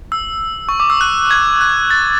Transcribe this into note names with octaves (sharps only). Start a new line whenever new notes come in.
E6
C#6
D6
E6
F#6
G#6
F#6
A6